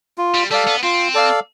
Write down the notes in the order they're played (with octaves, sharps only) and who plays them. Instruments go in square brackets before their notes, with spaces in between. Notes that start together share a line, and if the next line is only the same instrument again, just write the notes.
[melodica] F4
[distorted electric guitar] G3
[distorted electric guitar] G3 [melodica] A4 D5 F5
[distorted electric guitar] B3
[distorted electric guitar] C4 [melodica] F4
[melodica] A4 D5 F5